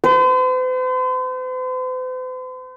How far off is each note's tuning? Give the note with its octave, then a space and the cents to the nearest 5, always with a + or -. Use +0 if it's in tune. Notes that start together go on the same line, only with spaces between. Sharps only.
C5 -45